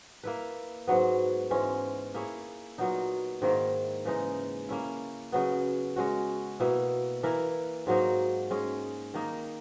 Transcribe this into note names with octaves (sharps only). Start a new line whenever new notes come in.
A#3 E4 B4
G#2 F#3 B3
G#2 E3 G#3 C#4
A#3 E4 G#4 C#5
A#2 F#3 B3 D#4
G#2 D#3 A#3 E4
C#3 E3 G#3 D#4
A#3 C#4 E4
C#3 F#3 B3
G#3 C#4 F#4
B2 A#3 E4
E3 A#3 E4 A#4
G#2 F#3 A#3 D#4
G#3 C#4 G#4
D#3 A#3 D#4